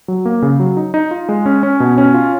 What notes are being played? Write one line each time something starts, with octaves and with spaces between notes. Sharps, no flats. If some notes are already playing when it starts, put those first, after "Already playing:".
F#3
A#3
C#3
F#3
D#4
D#4
F4
G#3
C#4
C#4
B2
C#4
F4